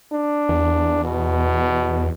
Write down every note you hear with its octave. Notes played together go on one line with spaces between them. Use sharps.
D4
E2
B2